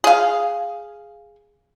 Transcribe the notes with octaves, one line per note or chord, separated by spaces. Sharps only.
G#4 F5